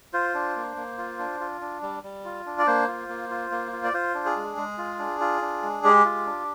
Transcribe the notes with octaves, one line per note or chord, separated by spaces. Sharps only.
F4 C5
D4
A#3
A#3
F4
D4
F4
D4
G3
G3
F4
D4
D5
A#3 C5
F4
A#3
F4
A#3
F4
D5
F4 C5
D4
G#4
G#3
G#3
F4
D4
F4
D4
G#3
G#3 G4
F4
D4